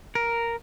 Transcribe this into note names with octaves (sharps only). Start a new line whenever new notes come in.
A#4